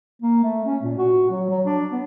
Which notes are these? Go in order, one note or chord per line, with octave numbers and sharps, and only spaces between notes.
A#3
A3
C#4
A#2
F#4
F#3
F#3
D4
B3